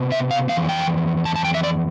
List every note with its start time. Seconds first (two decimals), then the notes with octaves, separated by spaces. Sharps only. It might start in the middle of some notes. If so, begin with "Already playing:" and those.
Already playing: C3 B3
0.12 E5
0.31 F5
0.49 F2 E3 F5
0.69 G5
1.25 A5
1.36 A5
1.45 G5
1.54 E5
1.63 D5